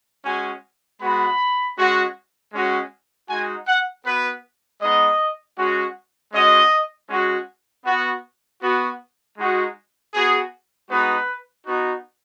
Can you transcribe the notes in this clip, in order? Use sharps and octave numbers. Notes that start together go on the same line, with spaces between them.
G#3 C#4 F#4 G#5
G#3 B3 F#4 B5
G#3 C#4 F#4
G#3 C#4 F#4
G#3 D#4 F#4 G#5
F#5
B3 F#4 B4
G#3 B3 D#4 D#5
G#3 C#4 F#4
G#3 C#4 F#4 D#5
G#3 C#4 F#4
B3 F#4
B3 F#4
G#3 D#4 F#4
B3 F#4 G#4
G#3 B3 D#4 F#4 B4
B3 D#4 F#4